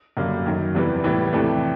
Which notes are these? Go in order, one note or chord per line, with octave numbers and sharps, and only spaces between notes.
F#2 D3 G3 A#3
F#2 D#3 F#3
E2 C3 E3 G3 B3
A2 E3 G3 B3
F2 C3 E3 A3 D4